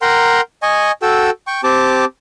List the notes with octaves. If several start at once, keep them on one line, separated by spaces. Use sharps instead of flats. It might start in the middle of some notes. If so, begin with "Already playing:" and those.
A#4 F#5 G5 A#5 C6
D#5 G#5 C#6
F#4 A4 G5 E6
G5 C#6
C4 G4 A5 D6